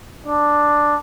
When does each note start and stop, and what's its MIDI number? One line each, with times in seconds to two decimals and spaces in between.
0.27 0.95 62